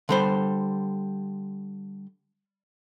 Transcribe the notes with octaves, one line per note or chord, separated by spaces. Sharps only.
D3 G3 C5